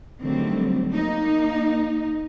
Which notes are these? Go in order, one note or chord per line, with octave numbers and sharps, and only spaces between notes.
D3 D#3 F#3 G3 A3 C4
A#3 D#4